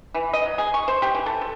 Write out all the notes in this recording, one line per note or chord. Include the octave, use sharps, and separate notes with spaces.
E3
D#5
F#3
G#4
C#6
C5
G4
E3
A4
A4